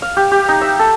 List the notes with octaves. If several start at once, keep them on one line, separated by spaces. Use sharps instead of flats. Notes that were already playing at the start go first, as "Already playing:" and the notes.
F5
G4
G4
D#4
E5
A4